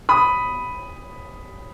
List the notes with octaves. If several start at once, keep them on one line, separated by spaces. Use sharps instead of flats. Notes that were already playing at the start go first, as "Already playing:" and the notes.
B5 D#6